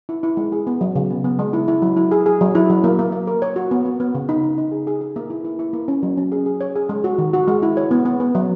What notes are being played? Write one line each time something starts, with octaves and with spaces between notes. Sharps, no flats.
E4
E4
G#3
G#4
B3
F#3
C#3
B3
B3
G#3
E4
E4
F#3
E4
G#4
G#4
F#3
E4
F#3
A#3
A#3
A#3
A#4
C#5
F#4
B3
B3
B3
C#3
D#4
D#4
D#4
G#4
G#4
G#4
A#3
E4
E4
E4
A#3
C#4
F#3
C#4
G#4
G#4
C#5
G#4
G#3
F#4
D#3
F#4
G#3
E4
C#5
B3
B3
B3
F#3